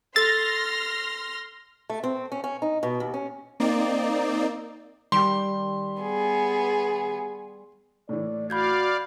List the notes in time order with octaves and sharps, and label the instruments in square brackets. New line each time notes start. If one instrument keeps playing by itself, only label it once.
[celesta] A4 E6 [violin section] C6 F6 A#6 [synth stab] A6
[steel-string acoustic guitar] A3
C4
C#4
C#4
D#4
B2
D#2
C#4
[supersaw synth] A#3 C4 D#4 D5
[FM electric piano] D#3 G4 [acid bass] G3 [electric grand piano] C6
[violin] B3 G#4
[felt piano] A2 E3 [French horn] D5
[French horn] F#4 [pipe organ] D5 F5 [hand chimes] B5 G6 G#6